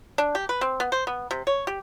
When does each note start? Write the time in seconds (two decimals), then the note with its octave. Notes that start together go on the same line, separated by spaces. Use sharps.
0.18 D4
0.35 G4
0.49 B4
0.61 C4
0.80 B3
0.92 C5
1.07 B3
1.31 C3
1.47 C#5
1.67 G4